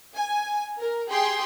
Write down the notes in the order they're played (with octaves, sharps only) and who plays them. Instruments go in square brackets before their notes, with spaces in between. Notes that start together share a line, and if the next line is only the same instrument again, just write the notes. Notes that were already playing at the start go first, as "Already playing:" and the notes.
[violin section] G#5
A#4
G4 G#4 G5 C6